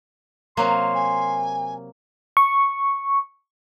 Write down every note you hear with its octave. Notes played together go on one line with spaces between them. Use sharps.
C3 F#3 A#3 C6
G#5
C#6